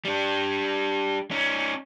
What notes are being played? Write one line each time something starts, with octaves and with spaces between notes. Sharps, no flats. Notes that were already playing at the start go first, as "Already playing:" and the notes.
G3 D4
C#4 D#4